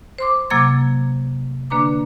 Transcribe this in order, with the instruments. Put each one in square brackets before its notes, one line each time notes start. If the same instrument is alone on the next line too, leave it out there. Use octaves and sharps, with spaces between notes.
[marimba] C5 C6 D6
C3 F#3 A#3 D6 G#6 A6
D3 A#3 D4 B4 A#5 D6